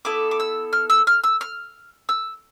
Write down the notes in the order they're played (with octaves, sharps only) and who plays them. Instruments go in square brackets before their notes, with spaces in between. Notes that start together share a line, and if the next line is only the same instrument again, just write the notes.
[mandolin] B3 E4 A4 D6
D6
E6
F6
E6
F6
E6
F6
E6